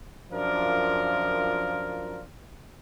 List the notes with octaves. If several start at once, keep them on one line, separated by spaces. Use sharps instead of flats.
F#2 F3 D4 F4 A#4